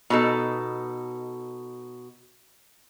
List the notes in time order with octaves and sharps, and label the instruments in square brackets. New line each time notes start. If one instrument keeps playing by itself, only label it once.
[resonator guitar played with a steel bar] B2 D#4 A4